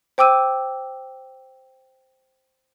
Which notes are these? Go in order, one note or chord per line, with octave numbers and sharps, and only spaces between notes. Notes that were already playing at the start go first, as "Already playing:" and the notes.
C5 G5 D6 E6 D#7